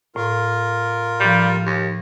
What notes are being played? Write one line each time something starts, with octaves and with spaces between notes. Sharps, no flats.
A2 F4 A#4
A2 F3 G3
D#2